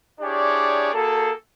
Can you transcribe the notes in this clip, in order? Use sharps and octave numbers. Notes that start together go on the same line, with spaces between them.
D4 E4 G4 G#4 C#5 D5
A#3 F#4 G#4 A4